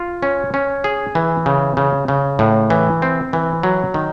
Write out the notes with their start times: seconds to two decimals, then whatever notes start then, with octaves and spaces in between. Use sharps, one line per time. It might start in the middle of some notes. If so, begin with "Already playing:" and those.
Already playing: F4
0.23 C#4
0.54 C#4
0.84 G#4
1.15 E3
1.46 C#3
1.77 C#3
2.08 C#3
2.39 A2
2.70 E3
3.02 C4
3.33 E3
3.63 F#3
3.94 D#3